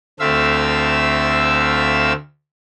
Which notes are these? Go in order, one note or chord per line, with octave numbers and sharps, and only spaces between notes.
D2 A3 C4 E5 F5 E6